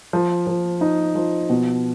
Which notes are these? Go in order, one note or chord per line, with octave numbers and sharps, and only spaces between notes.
F3
F3
D#4
F3
B2